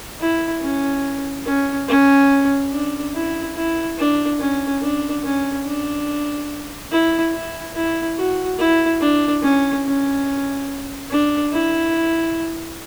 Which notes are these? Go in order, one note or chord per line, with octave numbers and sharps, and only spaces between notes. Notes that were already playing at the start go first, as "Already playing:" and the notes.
E4
C#4
C#4
C#4
D4
E4
E4
D4
C#4
D4
C#4
D4
E4
E4
E4
F#4
E4
D4
C#4
C#4
D4
E4